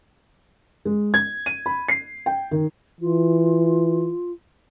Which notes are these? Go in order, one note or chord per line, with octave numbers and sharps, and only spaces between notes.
G#3
G#6
D#7
B5
C7
G5
D#3
E3 F4